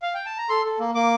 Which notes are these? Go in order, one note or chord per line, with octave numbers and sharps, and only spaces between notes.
F5
G5
A5
A#5
A4 C6
A4
A#3
A#3 D6